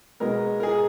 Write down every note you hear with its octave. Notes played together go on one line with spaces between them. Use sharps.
B2 G#3 B3 A#4
A#4
G#4